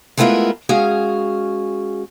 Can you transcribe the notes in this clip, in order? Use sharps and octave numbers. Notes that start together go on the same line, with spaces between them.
G#3 A3 B3 E4 F4 A#4
G#3 C#4 F#4 G#4 F5